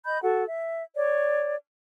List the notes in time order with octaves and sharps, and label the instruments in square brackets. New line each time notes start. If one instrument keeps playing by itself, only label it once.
[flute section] D#5 B5 G6
F#4 A4 F#5
E5
C#5 D5